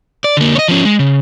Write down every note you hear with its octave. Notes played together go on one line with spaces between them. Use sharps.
D5
D3 A#3
C#5 D#5
F3 C#4
G#3
C#3